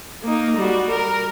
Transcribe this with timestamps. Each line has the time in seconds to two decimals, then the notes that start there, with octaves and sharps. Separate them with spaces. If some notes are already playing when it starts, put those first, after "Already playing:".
0.23 A#3 D#4
0.56 G3 F#4
0.90 A#4